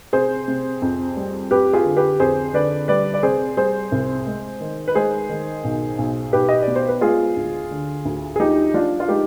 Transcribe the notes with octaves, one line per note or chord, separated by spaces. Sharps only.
C3 G#4 C5
C3
F2
G3
F2 G4 B4
F4 G#4
D3
G4 B4
F2 G#4 C5
D3 B4 D5
G3 B4 D5
D5
C3 G#4 C5
G3 G#4 C5
C2
G#3
D#3
B4
G#3 G#4 C5
D#3
B1
B1
B1 G4 B4
D#5
D5
B2
C5
B4
G#3 F4 G#4
D2
D3
D2
G#4
F3 D#4 G4
F3 D4 F4
F4
G#3 D#4 G4